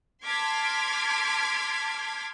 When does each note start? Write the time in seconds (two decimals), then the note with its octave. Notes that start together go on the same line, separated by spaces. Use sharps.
0.24 A5 C6 D6 F6 G#6 B6